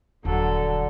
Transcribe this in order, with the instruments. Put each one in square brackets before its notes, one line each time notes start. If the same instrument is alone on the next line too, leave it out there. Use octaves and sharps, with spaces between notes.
[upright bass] D#1 [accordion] D3 [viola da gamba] F#3 A4